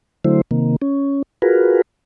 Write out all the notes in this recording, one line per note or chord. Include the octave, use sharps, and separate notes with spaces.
D3 F#3 A3 E4 C5
C3 D#3 A#3
C#4
F4 F#4 G#4 A#4 B4